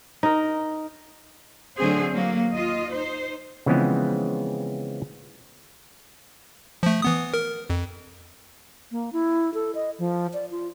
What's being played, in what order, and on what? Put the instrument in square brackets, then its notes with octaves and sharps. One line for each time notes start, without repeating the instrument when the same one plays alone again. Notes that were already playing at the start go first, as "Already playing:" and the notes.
[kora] D#4 A#4
[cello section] D3 F#3 A3 C4 G#4 C5
F#3 A#3
D#2 F4 D#5
D#4 C5
[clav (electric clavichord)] C#3 E3 F3 G#3 B3 C4
[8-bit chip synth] F3 A3
E3 B3 D#6
A#4
F2
[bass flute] A#3
E4
A4
D#5
F3
D5
F4